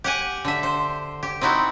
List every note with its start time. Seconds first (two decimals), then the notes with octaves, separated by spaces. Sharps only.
0.04 G4 F#5 G#5
0.45 D3 E5
0.63 C5
1.23 G4
1.41 C4 D#4 E4 F#4